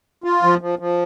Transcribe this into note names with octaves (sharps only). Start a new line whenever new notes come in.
F4
F3
F3
F3